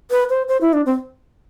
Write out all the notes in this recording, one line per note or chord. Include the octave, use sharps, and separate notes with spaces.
B4
C5
C5
E4
D4
C4